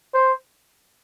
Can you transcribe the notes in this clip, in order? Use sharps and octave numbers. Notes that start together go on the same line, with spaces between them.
C5